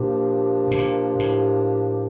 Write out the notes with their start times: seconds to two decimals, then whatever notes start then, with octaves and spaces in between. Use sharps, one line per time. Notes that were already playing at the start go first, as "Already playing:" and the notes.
Already playing: A#2 F3 A#3 D4 G4
0.71 A2
0.78 A#2
1.19 A2